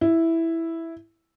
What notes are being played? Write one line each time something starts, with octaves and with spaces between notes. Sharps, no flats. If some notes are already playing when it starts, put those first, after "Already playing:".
E4